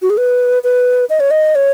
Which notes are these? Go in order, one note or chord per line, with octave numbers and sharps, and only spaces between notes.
F#4
G#4
B4
B4
D#5
C#5
D#5
C#5